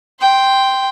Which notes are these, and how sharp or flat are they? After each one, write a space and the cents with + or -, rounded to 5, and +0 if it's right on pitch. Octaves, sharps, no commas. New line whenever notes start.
G5 +0 C6 +0